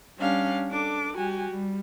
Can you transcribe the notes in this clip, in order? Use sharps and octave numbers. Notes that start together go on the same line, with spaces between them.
G3 C#4 D4 G4 F5
D4 A4 D6
G3 F#4 G4 G#5
G3